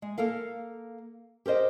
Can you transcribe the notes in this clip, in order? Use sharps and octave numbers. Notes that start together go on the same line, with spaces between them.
G#3
A#3 A4 A#4 F5
G4 A#4 C5 D#5